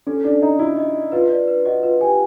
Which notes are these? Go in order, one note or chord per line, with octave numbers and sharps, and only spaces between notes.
C#4 A4
D4 A4
D#4 A#5
E4 F#4
D#5
D#5
F4 B4
D5
B4
F#4 D#5
F4 B4
G4 G#5